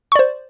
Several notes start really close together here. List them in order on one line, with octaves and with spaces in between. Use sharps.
C#6 D5 C5